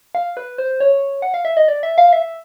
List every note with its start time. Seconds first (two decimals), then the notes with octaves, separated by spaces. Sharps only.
0.15 F5
0.37 B4
0.58 C5
0.80 C#5
1.22 F#5
1.34 F5
1.45 E5
1.57 D#5
1.68 D5
1.83 E5
1.98 F5
2.13 E5